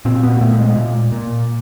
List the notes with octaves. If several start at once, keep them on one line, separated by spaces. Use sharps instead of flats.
A#2 C4
B3
A#2 A3
G#3
A#2
A#2